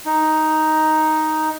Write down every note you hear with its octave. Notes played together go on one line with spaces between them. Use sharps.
D#4